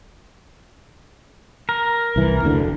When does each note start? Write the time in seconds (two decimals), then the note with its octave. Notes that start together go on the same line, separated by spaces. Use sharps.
1.69 A#4
2.16 C2 E3
2.44 F1 D2 D3